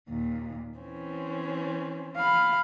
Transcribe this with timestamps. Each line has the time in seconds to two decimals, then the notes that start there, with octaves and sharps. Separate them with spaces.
0.10 D#2 A#2
0.81 E3 C4 C#4
2.16 F5 B5